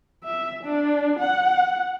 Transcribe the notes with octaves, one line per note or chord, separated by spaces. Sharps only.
E5
D4
F#5